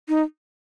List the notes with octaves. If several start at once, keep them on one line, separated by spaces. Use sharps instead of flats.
D#4